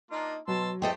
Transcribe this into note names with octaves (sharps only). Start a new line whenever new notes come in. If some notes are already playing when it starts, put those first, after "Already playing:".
A#3 D4 D#4 F4
B2 F#3 A5 C6 E6
E2 A3 C4 G4 A4 D#5 G5